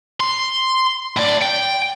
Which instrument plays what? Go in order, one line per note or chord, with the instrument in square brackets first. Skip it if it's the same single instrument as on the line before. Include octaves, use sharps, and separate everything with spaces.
[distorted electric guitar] C6
A2 D5
G5